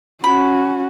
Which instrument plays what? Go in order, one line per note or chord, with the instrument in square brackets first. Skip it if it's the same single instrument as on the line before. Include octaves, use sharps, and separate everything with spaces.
[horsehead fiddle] C#4 F#4 [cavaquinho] B5